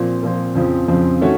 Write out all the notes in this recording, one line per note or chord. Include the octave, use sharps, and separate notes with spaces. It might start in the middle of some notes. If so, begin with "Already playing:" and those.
Already playing: A#2 F3 C4
A#2 F3 C4
F2 C#3 F3 C4
F2 C#3 F3 C4
D#3 A3 C#4 F#4